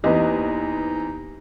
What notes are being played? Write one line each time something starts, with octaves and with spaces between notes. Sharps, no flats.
E2 A#3 C4 D#4 G4 B4 D#5